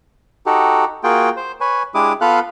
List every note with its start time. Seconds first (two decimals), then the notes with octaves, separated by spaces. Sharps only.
0.46 D#4 F#4 G4 A4
1.04 A#3 F4 F#4 G#4 G5
1.37 C5
1.61 B4 C#5 G#5
1.95 G#3 D4 E4 G4 D6 D#6
2.21 B3 F4 A4 B4 F5 F#6